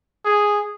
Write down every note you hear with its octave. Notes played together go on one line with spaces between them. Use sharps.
G#4